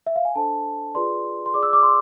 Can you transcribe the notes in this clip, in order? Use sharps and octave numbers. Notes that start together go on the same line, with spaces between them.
E5
F5
G#5
D4 A4 C5 A5
F4 G#4 B4 D5 C6
C6
F4 G#4 D5 D6
E6
D6
C6